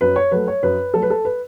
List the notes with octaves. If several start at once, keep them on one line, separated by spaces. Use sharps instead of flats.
F#2 B4
C#5
F#3 A3 B4
C#5
F#2 B4
F#3 A3 A4
B4
A4
B4